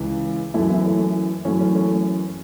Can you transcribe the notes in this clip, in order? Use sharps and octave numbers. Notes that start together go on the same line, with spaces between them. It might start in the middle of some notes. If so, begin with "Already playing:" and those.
Already playing: C#2 C#3 E3
F#2 E3 E4 A4
B3 E4
A3 C#4
F#2 E3 A3 C#4
A3 C#4
A3 C#4